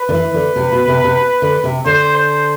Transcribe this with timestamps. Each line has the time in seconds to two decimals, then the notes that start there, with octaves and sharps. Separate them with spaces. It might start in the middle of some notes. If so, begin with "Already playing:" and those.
Already playing: B4
0.09 D3
0.13 E3
0.34 D3
0.56 C3
0.72 B2
0.88 C3
1.04 C3
1.42 D3
1.64 C3
1.85 D3 C5
2.17 C5